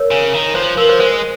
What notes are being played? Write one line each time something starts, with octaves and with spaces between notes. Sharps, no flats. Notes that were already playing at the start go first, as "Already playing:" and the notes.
Already playing: A#4 C#5
C#3
D#3
F3 C5
C5
F3 A#4
C5
G#3 C5